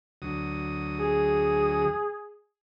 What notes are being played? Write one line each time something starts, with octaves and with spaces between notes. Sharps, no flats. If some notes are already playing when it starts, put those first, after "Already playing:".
D2 F#3 D#6
G#4